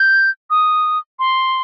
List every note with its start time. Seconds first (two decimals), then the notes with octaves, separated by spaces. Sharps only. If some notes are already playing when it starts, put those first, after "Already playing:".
Already playing: G6
0.50 D#6
1.19 C6